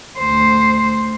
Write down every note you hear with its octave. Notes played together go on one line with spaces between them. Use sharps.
D2 C5